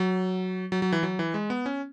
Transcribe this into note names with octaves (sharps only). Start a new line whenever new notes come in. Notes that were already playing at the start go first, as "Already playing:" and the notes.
Already playing: F#3
F#3
F#3
E3
F#3
E3
G#3
B3
C#4